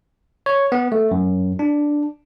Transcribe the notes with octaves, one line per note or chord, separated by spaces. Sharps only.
C#5
B3
A3
F#2
D4